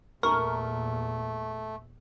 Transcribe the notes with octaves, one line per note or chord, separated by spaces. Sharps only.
E2 A#2 A3 A#4 C#6